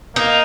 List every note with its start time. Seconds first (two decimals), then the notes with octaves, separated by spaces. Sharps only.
0.16 A#3 D#4